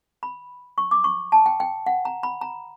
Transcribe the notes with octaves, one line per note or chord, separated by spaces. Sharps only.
B5
C#6
D6
C#6
A5
G5
G5
F#5
A#5
B5
A#5